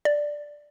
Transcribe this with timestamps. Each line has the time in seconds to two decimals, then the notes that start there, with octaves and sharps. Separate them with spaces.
0.05 D5